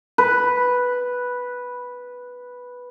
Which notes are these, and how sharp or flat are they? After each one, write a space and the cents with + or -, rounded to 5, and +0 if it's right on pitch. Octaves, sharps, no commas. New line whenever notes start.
B4 -5